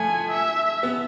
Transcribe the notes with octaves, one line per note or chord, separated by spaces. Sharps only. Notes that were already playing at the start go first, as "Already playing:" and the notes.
Already playing: F3 A3 G#5
E5
B3